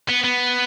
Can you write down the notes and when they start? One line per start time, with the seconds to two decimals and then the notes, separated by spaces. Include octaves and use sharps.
0.09 B3
0.24 B3